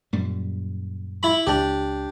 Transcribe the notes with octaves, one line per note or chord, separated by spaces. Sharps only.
F#2 A#2 G3
E4 B5
C#2 D4 G4